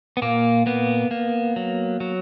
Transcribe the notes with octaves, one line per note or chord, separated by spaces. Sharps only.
B3
A#2 A#3
A#3 B3
A#3
F#3
F#3